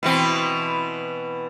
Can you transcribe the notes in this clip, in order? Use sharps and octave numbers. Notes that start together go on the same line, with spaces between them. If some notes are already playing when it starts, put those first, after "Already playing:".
B2 E3 C4